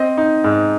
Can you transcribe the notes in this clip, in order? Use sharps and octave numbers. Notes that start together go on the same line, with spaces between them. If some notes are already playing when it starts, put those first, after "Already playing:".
Already playing: C4 D#5
D#4
G#2